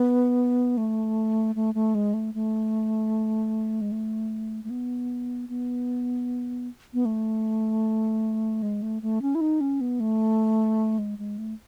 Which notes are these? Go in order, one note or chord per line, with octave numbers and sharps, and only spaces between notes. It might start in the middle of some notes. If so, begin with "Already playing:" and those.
Already playing: B3
A3
A3
A3
G#3
A3
A3
G#3
A3
A3
B3
B3
B3
A3
G#3
A3
A3
C#4
E4
D#4
C#4
B3
A3
G#3
G#3
A3